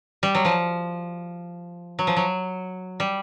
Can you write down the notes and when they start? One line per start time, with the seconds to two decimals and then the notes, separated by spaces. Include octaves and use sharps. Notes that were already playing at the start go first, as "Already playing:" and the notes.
0.23 G3
0.35 F#3
0.45 F3
1.99 F#3
2.07 F3
2.16 F#3
3.00 G3